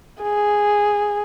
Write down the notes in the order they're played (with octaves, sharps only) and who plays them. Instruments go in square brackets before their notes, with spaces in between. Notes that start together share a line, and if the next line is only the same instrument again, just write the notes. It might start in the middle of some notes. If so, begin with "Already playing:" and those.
[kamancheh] G#4